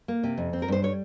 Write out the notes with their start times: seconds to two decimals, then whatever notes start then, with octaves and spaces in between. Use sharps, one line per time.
0.08 A#3
0.23 C3
0.38 F2
0.53 C4
0.62 A#4
0.68 G2 C5
0.82 G3 C#5